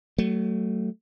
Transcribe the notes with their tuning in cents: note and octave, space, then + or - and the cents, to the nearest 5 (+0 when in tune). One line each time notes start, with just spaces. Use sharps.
F#3 +35 A3 +10